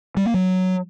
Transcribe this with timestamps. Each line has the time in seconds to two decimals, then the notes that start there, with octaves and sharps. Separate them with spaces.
0.17 G3
0.25 A#3
0.34 F#3